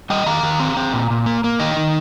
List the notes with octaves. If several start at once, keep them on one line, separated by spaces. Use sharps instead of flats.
G3 D#5 G5
D#3 F5 A#5
D#3
C4
C4
A#2
A#2
A#3
A#3
D#3 D#5 G5
D#3